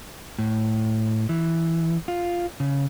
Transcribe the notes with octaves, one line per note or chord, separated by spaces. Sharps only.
A2
E3
F4
C#3